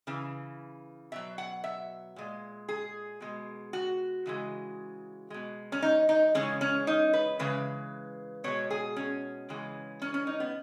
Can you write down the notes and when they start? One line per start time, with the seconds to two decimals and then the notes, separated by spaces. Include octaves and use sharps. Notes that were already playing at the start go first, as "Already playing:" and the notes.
0.07 C#3 E3
1.12 B2 F#3 E5
1.38 F#5
1.64 E5
2.16 A#2 G#3
2.69 G#4
3.21 B2 G#3
3.73 F#4
4.26 C#3 E3 G#3
5.30 B2 G#3
5.72 C#4
5.82 D#4
6.09 D#4
6.35 C#3 E3 G#3 C#4
6.61 C#4
6.87 D#4
7.13 B4
7.39 C#3 E3 G#3 B4
8.44 B2 G#3 C#5
8.70 G#4
8.96 C#4
9.49 C#3 E3 G#3
10.02 C#4
10.14 C#4
10.27 D#4
10.40 B3